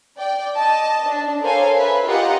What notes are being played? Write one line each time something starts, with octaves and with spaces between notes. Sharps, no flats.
D5 G5
D#5 A5
D4
A4 A#4 C5 C#5 F5 G#5
B4 E5 G#5
F4 G4 A#4 D#5 F#5